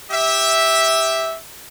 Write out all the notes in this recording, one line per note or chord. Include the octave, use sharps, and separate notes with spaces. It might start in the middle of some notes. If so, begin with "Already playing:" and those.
G4 E5